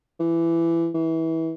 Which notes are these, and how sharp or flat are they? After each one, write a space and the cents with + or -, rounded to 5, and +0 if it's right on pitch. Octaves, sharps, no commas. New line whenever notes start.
E3 +20
E3 -25